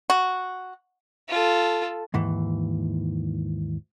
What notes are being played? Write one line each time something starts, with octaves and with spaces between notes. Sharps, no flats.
F#4
F4 A4
D#2 G#2 E3